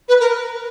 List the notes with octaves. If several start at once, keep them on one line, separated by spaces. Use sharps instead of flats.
B4
A#4